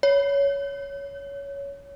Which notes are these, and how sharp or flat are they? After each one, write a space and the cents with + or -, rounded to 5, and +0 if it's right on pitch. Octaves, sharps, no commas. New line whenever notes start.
C#5 +15